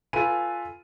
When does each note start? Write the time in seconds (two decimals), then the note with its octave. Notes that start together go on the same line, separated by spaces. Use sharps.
0.13 F4 A4 B4 G#5 D#7